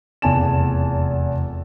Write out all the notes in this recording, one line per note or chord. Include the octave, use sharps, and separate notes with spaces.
F1 E2 G#5 A5 E7